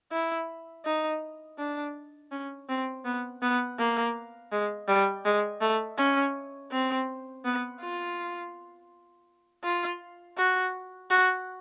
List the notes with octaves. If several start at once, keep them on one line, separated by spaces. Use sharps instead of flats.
E4
D#4
D4
C#4
C4
B3
B3
A#3
G#3
G3
G#3
A3
C#4
C4
B3
F4
F4
F#4
F#4